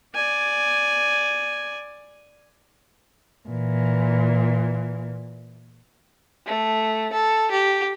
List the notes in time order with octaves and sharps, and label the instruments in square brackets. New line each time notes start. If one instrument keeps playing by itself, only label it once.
[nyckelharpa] D5 G#5
[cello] A#2 E3
[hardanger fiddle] A3
A4
G4